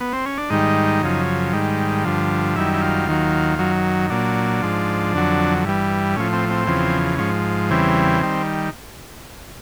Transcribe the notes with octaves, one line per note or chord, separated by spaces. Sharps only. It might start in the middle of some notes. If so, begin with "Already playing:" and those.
B3
C4
C#4
D4
G#2 D#3 G3 D#4
F#2 C#3 F3
G#2 D#3 G3
G2 D3 F3
F#2 D#3 G3 E4
E4
F4
D#2 D#3 F#3
F#2 D#3 F#3
A#2 F#3 D4
G#2 F3
F2 D3 F#3
G2 E3 G3
A2 F3 C#4
C4
C4
E2 C#3 F3
G#2 F3 C#4
E2 C#3 E3 G3 C4
D#3 G3